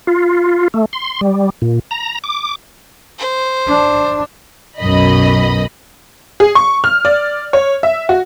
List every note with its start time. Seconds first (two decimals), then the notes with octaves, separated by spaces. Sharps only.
0.07 F4
0.74 A3
0.93 C6
1.21 G3
1.62 A#2
1.91 A#5
2.24 D6
3.19 C5
3.67 D4
4.78 B1 F#2 B2 D#5 B5
6.40 G#4
6.55 C#6
6.84 F6
7.05 D5
7.53 C#5
7.83 E5
8.09 F#4